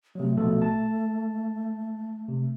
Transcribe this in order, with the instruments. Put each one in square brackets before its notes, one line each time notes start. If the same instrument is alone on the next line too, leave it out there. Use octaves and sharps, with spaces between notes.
[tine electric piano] C3 F#3 [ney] A3
[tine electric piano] A#1 B2 A4
A5
C3